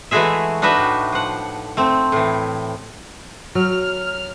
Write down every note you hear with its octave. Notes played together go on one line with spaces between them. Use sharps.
E3 G#3 A3 F#4 G#4 E5
D4 D#4 F#4 B4 E5
A2
F3 F#5
A3 C4
A2 E3
F#3 F6